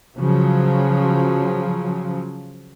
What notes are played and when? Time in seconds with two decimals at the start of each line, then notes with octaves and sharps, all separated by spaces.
0.17 C#3 F3 F#3